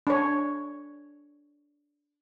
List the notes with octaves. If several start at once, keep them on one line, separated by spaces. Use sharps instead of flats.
D4 C#5